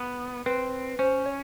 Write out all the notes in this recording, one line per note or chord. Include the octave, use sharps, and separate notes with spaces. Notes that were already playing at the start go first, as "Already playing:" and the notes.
Already playing: B3
C4 B4
C#4 C5
C#5